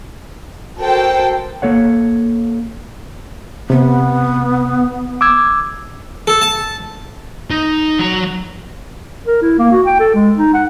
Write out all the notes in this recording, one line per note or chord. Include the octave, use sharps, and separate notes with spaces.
F#4 A4 A#4 C5 G5
A#3 A4 C#5 F#5
C3 B3
D6 E6 G#6
A4
A5
D#4
F#3 A#5
A#4
E4
A#3
F#4
G5
A4
G#3
D#4
F#5